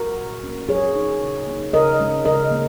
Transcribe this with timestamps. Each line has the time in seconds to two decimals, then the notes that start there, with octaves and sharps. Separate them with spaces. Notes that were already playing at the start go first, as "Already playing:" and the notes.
Already playing: F#4 A#4
0.17 A#2
0.44 A#3 C#4
0.69 F#3 G#4 C#5
0.95 D#4
1.21 C#3
1.47 A#3 D#4
1.73 C#3 A#4 D#5
2.00 G#3 C#4
2.25 C#3 A#4 D#5
2.51 A#3